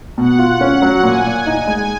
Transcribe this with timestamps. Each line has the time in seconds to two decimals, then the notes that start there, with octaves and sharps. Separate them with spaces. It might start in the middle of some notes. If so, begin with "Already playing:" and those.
0.18 B2 F#5
0.39 F4
0.61 C#4 F#5
0.82 F#3
1.03 A#2 G#5
1.25 A#2
1.46 D#4
1.67 G#3